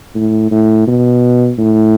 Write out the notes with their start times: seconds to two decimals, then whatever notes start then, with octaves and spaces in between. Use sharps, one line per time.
0.15 A2
0.51 A2
0.87 B2
1.59 A2